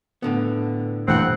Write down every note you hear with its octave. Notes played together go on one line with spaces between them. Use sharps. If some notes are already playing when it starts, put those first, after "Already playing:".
A2 D3 B3
G2 A#2 E3 A3 C4 F#5